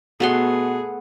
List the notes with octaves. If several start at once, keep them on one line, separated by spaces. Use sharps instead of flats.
B2 A3 B3 F#4 G#4 F#5 C6